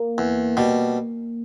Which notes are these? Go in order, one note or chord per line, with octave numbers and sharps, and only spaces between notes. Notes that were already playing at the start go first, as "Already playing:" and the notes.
Already playing: A#3
E2
B2 G3